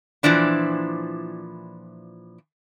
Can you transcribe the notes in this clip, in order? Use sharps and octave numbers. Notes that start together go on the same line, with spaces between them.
A#2 E3 F3 D4 E4